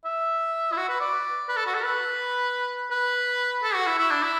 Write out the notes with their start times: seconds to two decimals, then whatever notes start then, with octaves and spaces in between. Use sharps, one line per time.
0.05 E5
0.72 E4
0.77 F#4
0.89 B4
1.00 D5
1.48 B4
1.56 A4
1.66 F#4
1.74 A4
1.83 B4
2.91 B4
3.63 A4
3.74 F#4
3.86 E4
3.98 E4
4.11 D4
4.22 E4